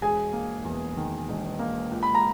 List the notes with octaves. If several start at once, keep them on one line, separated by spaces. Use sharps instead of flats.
E1 G#4 G#5
A#3
E2
D#3
E1
A#3
C#2
B5
A#5